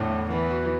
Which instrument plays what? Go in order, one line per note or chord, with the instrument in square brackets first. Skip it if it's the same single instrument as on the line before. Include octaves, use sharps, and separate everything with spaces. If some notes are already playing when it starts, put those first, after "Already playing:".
Already playing: [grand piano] E2 D3 A3 [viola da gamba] A2
[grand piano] E2
[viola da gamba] E3 [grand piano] B3
[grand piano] F#4